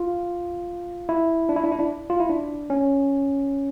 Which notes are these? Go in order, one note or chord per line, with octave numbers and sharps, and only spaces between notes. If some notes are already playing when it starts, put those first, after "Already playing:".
Already playing: F4
E4
D4
E4
D4
E4
D4
F4
E4
D4
C#4